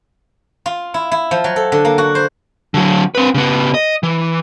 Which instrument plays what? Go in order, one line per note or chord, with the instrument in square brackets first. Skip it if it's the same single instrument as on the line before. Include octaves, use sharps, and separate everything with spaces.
[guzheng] F4
E4
E4
F3
F#3
A4
D3
A#3
F#4
C5
[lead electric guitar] D3 F#3
C4 B4
C#3 B3
D#5
E3